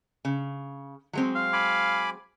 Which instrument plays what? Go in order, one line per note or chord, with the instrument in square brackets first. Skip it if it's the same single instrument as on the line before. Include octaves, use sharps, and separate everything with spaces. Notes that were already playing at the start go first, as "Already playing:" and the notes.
[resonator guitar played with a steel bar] C#3
F#3 G#3 C4
[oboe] F5
[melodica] G#5 B5 D6